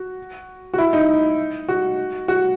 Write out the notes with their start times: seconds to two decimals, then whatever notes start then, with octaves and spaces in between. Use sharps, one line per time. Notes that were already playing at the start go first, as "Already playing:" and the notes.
Already playing: F#4
0.74 F#4
0.78 E4
0.93 D#4
1.69 F#4
2.28 F#4